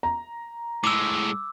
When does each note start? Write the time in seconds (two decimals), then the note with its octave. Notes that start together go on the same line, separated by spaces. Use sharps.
0.03 A#5
0.84 A2 G#3 D6 E6